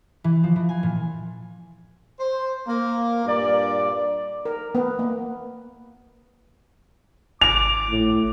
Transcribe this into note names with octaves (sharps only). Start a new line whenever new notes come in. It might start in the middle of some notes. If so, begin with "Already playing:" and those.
E3
F3
E3
G#5
A#2
C5
A#3
G2 A#2 D5
A#4
B3
A#3
G#1 D6 F7
A2